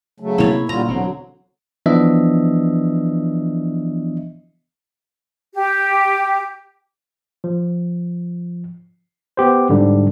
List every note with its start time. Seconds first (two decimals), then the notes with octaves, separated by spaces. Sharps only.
0.20 C#3 F#3 A3
0.38 C3 A#3 E4 C#5
0.69 A#2 D3 G3 F4 A#5
0.88 E1 D3 F#3 C4
1.86 E3 F3 B3 D4 D#5 E5
5.55 G4
7.44 F3
9.37 B3 G4 C5
9.69 G#2 D3 G3